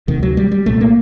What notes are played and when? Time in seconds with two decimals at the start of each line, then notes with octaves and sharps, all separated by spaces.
0.08 D2 C3 D#3
0.23 F#3
0.37 G3
0.52 G3
0.66 C2 A#2 A3
0.81 A#3